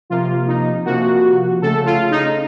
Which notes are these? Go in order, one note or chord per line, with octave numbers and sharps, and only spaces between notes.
C3 F3 A#3 F4
D#4
C3 F3 A#3 F#4
C#3 A3 A4
F4
D#4